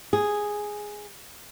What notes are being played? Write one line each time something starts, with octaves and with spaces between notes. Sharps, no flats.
G#4